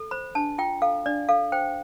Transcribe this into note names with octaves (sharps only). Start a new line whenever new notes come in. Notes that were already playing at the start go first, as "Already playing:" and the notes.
Already playing: A4
C5 B5
D4 A5
F4 G5
A4 F5
D4 D5
A4 F5
C5 G5